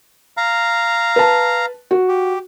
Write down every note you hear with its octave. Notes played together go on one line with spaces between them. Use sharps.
F5 A#5
B4 A5
F#4
G4